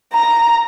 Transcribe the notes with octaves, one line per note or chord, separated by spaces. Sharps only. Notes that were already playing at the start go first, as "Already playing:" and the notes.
A#5